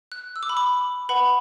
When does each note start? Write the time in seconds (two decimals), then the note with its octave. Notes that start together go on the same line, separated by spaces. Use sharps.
0.12 F#6
0.36 E6
0.43 D6
0.49 B5
0.57 D6
1.09 B4 F#5 B5